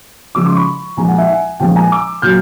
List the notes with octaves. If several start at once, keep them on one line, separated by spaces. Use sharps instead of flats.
C#3 F3 G#3 D6 E6
C6 D6
B5 C#6
A#2 F3 G#3 G#5 A#5
F#5 G#5
E5 F#5
F#5 G#5
A#2 F3 G#3 G5 A5
G#5 A#5
D6 E6
A#2 F#3 F6 G6